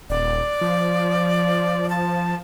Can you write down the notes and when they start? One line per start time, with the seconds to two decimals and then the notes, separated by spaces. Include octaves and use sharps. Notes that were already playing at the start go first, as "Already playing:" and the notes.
0.10 D#1 D5
0.61 F3
1.90 A5